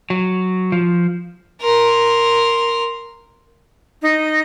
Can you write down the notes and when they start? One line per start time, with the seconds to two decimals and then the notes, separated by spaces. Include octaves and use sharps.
0.10 F#3
0.72 F3
1.61 A#4 C6
4.02 D#4